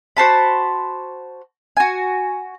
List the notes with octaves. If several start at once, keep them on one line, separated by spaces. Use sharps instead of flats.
F#4 C5 A5 B5
F#4 G#5